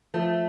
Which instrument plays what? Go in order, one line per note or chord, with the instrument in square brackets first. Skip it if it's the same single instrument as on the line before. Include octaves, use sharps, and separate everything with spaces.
[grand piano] F3 [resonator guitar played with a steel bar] A3